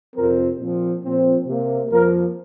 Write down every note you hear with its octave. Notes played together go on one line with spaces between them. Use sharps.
F2 C3 F3 C4 A#4
A#2 F3 C4
A#2 F3 C4
C3 A#3
F2 F3 A#3 A#4